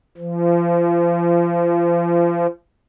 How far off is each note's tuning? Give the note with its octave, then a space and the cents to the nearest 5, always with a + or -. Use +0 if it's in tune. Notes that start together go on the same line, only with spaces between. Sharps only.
F3 -35